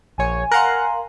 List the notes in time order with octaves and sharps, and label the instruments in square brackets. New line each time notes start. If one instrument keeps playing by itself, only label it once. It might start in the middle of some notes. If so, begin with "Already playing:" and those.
[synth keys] A#1 C#5 [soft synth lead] G#5
[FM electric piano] A#4 F5 C6 [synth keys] F#5 A#5 F#6